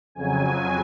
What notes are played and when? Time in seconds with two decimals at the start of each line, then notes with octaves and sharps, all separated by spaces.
0.15 F2 C#3 F#3 G#5